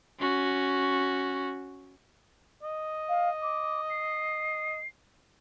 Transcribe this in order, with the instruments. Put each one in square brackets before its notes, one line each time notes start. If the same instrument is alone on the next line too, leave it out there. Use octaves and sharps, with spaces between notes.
[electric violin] C#4 F#4
[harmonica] D#5
[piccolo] F5
D6
C7